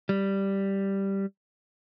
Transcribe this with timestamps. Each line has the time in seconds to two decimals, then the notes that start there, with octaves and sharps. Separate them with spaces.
0.09 G3